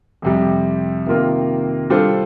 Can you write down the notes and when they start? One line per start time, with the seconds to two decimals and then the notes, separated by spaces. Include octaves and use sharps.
0.22 F2 C3 G3
1.06 C3 D#3 A#3 F4 A#4
1.90 G3 D4 F4 A4 C5